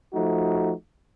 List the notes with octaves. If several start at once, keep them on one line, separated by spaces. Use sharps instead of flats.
F3 A3 D#4 F#4